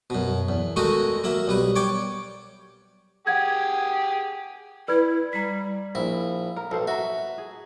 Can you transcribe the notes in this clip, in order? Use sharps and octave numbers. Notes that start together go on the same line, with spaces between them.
F#2 B2
E2
D#3 G#3 A3 F#4 D#5
F#3 A#3 E5
B1 G3 B4
C#5 D5 G5 D6
G4 G#4 F#5 G#6
E4 B4 D5 B5 G#6
G3 A#5 B6
A#1 E4
A#4
B1 A4 C5
F#4 E5 A#5
G#4